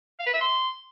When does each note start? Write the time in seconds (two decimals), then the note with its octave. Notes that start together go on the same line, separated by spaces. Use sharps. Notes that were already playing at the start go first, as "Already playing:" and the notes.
0.19 F5
0.26 B4
0.34 E5
0.41 C6